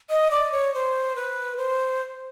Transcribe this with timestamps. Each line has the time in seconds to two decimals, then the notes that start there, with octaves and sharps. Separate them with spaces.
0.10 D#5
0.31 D5
0.52 C#5
0.74 C5
1.16 B4
1.57 C5